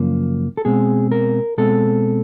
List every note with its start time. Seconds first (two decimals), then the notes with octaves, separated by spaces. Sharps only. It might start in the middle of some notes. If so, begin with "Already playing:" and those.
Already playing: F#2 C#3 F3 A#3
0.57 A4
0.65 B2 G#3 C4 G#4
1.12 A#4
1.58 B2 G#3 C4 A4